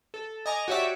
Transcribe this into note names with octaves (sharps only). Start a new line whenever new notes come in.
A4
D#5 G#5 A#5 D6
F#4 G4 C#5 D5 E5 F#5